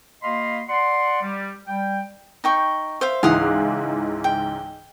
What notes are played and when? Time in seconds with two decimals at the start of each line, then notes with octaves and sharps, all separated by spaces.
0.23 A#3 F#4 D#5 F5 B5 C6
0.69 D5 F#5 C6
1.23 G3
1.68 G3 G5
2.44 D#4 G5 C#6
3.01 C5 E5 F5
3.23 C#2 G#2 E3 F5 F#5 D#6
4.24 G5